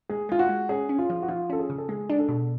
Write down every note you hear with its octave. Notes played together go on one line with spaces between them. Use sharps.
G#3 G#4
G#3 F4
F#4
G#3
C#4 G#4
C#4
F4
F3
F#4
F3 F4
C#4 A4
G#4
C#3
A4
G#3 G#4
D4
A4
B2